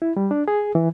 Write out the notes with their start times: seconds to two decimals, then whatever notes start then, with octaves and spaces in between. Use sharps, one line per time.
0.02 E4
0.17 G3
0.31 D4
0.48 G#4
0.75 E3